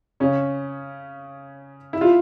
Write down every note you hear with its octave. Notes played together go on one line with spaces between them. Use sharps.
C#3 C#4
E4
F4